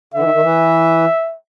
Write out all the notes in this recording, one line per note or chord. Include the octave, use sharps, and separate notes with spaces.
D3 E3 E5
D#3
D#3
E3